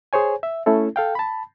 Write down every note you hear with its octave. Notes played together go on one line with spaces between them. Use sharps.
G#4 C5 C#5 G#5
E5
A3 C#4 E4 A4
A4 F5 G5
A5 B5